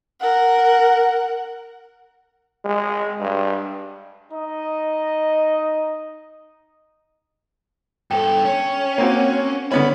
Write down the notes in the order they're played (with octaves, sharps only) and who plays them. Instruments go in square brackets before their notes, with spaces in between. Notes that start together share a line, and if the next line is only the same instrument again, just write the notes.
[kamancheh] A#4 F#5
[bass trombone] G#3
G2
[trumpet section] D#4 D#5
[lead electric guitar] G2 A4 [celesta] G5
[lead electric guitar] C#4
[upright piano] A#3 C4 F#4
[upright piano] D3 B3 C#4 [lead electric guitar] B5